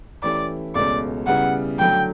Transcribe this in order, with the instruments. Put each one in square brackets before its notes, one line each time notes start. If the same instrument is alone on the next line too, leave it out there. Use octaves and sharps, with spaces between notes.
[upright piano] E3 A3 C#4 E4 G4 [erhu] D5
[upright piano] C#2 B2 A3 C#4 [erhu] D5
[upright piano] C#3 G3 B3 E4 [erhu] F#5
[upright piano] D3 F#3 A3 [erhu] G5